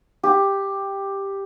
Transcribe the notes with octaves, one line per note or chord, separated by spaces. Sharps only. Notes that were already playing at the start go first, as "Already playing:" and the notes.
G4